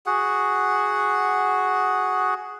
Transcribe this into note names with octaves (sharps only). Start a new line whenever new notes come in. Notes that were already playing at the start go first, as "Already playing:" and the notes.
F#4 G#4 F#5